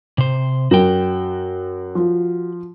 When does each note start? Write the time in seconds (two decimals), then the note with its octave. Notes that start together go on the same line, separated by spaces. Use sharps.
0.18 C3 C5
0.71 F#2 F#4 G5
1.95 F3